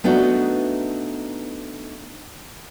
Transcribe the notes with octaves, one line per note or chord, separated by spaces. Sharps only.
A3 B3 D4 D#4 F#4